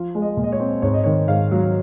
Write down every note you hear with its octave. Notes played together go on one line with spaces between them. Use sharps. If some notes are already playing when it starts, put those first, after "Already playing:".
Already playing: F3 F4
G#3
D#5
A#2
D#5
C#5
C4
G#2 C#5
D#5
D#3 C#5
G#2 F5
F#3